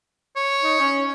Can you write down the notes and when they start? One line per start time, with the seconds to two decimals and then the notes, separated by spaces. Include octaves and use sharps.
0.36 C#5
0.63 D#4
0.79 C#4